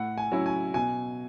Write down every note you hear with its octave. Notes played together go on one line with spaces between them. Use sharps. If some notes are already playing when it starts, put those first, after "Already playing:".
Already playing: A2 F#5
G#5
F#3 C#4 E4
G#5
B2 G#5